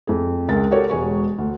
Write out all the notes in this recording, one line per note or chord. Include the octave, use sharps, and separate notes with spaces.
F2 G#4
C#2 G#3 A#4 A6
F#4 G4 A4 A#4 C#5
E1 G#3 G#5 C#6
D2